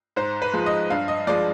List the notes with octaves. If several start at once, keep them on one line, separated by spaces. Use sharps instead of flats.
G#2 C5
B4
F3 G#3
D#5
G2 F5
D#5
F3 G#3 D5